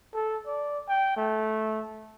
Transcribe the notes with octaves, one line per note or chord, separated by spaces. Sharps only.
A4
D5
G5
A3